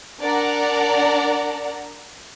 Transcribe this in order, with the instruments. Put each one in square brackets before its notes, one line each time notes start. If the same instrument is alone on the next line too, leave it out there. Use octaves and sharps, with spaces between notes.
[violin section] D4 A#4 D5 F#5 A#5